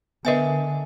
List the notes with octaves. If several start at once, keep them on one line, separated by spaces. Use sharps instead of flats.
D3 B3 A#4 B4 D#5 E5 G#5